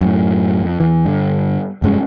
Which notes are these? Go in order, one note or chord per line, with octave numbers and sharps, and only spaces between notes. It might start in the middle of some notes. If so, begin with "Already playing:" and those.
F#2 A2
F2
E2 E3
G2 D3
F1 G2 G#3 C#4